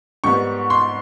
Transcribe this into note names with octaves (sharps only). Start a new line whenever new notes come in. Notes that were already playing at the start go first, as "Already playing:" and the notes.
G#2 D#3 G3 B3 C#6
C6